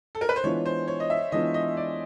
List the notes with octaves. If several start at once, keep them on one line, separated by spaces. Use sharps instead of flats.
A4
A#4
B4
C5
E3 G#3 B3 D4 F4 C#5
C5
C#5
D#5
E5
E3 G#3 B3 D4 F4 D#5
D#5
D5